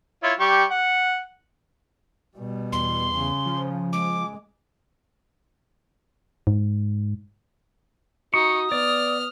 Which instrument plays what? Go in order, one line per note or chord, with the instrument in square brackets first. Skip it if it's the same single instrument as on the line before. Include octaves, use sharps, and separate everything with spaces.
[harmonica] E4 F4 C#5
G3 G4 C#6
F#5
[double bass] B2 G3
[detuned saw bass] E2 [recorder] C6
[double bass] C#3
[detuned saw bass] F3
[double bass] G#3 [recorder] D6
[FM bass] G#2
[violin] D#4 [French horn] F#4 [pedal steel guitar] C#6 [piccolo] D#6
[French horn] B3 [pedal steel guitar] D5 [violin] F6